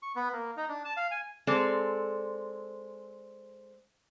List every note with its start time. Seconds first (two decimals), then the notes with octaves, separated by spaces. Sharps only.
0.02 C#6
0.16 B3
0.33 A#3
0.57 D#4
0.69 D4
0.85 A5
0.97 F5
1.11 G#5
1.47 G#3 C4 A4 D5